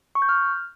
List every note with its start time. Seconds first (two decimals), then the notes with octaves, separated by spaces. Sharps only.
0.15 C#6
0.22 G6
0.29 F6